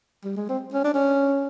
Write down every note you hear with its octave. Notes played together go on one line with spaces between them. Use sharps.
G3
G#3
C4
C#4
D4
C#4